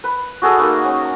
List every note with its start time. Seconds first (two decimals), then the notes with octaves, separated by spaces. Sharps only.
0.04 B4
0.42 F#4 G#4 A4 D#5
0.58 A#3 D#4 F#4
0.84 C#4
1.02 A#5